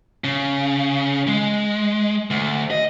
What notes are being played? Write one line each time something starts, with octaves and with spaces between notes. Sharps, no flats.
C#3
G#3
D2
D#5